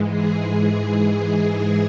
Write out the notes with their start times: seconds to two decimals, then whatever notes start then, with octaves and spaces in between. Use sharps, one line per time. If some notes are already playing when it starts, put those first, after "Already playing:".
Already playing: G#2 E3 G#3
0.09 G#4
0.40 G#4
0.71 G#4